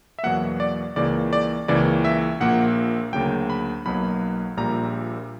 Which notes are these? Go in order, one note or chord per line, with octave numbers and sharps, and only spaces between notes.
E5
E2 B2 F#3 A#3 F#5
D5
C#2 C#3 E3 A#3 D5
D5
C#2 C#3 E3 A#3 D5
E5
A#1 A#2 A#3 F#5
D2 C#3 F#3 A#3 G5
B5
B1 B2 F#3 A#3 B5
A#1 A#2 G3 A#5